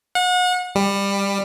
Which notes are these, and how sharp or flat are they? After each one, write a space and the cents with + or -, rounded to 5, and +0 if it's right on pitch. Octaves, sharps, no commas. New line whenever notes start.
F#5 -35
G3 +20